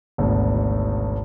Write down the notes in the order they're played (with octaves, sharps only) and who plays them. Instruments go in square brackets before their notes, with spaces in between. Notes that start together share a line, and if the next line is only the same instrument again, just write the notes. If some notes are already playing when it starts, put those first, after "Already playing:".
[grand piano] G#1 D2 B2